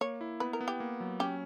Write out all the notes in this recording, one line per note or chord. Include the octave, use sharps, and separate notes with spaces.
A#3 C#5
E4
B3 B4
A#4
B3
G4
A#3
F#3
C#4 G4